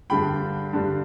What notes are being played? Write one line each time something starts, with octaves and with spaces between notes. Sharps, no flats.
G2 D3 G3 G5 B5
G2 D3 G3